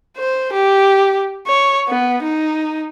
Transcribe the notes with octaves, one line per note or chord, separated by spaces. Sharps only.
C5
G4
C#5
B3
D#4